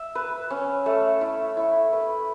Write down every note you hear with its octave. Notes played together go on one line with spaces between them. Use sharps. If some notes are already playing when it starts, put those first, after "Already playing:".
Already playing: E5
B4
C#4
A3
E4
E4
B4